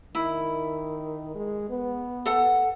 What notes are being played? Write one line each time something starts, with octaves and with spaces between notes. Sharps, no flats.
D#3 E4
G#3
B3
A4 F#5